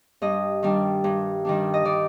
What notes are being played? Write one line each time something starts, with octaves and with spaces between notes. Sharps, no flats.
G2 D#5
D#3 G3 D4
G2
D#3 G3 D4
D#5
D#3 D5